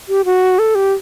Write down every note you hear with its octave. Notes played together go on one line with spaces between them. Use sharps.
G4
F#4
A4
G4